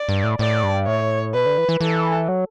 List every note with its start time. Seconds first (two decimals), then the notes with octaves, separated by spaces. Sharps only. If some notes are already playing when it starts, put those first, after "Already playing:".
Already playing: D5
0.09 G2
0.24 A2
0.39 A2 D5
0.63 G2
0.87 A2 C#5
1.34 B2 B4
1.46 D3
1.58 E3
1.69 E3
1.81 E3 A4
2.28 F#3